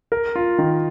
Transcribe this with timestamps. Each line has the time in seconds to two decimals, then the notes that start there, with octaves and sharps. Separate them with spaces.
0.12 A#4
0.36 F4
0.58 D#3